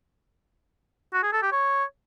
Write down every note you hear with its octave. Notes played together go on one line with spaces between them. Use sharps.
F#4
G#4
A4
G4
C#5